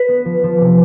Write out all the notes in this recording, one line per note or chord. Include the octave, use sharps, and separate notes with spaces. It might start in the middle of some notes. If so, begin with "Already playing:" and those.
Already playing: B4
B3
F3
F3
C3